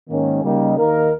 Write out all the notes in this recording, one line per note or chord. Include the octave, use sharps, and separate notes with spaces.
G#2 D#3 A#3 C#4
C#3 G3 A#3 D#4
D#2 D#3 A#3 D#4 A#4